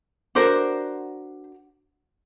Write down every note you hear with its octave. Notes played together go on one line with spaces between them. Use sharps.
D4 F#4 A#4 C5